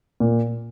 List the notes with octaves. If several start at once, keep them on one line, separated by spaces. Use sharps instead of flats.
A#2